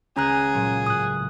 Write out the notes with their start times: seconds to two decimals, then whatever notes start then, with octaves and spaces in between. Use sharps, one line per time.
0.16 C#2 C#4 G#4 A#5 F#6
0.54 A#2 C#3 F#3
0.86 A2 D#6 F#6